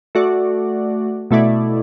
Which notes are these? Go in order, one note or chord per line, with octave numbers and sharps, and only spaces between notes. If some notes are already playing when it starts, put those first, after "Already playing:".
A3 F#4 D5
B2 A3 E4 D5